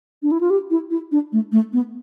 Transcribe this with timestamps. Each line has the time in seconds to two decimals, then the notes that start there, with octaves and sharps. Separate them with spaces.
0.23 D4
0.32 E4
0.41 F4
0.50 G4
0.70 E4
0.91 E4
1.12 D4
1.33 A3
1.52 A3
1.73 B3